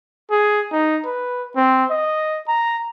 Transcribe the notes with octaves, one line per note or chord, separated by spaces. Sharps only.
G#4
D#4
B4
C4
D#5
A#5